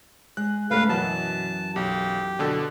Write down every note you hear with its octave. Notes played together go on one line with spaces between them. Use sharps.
G#3 F#6
G#2 C#3 A3 B4 F5
F#2 B2 E3 F#3 A5
B1 G4
B2 D3 A4